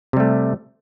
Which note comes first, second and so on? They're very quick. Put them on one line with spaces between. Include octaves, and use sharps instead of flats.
C3 G3 A3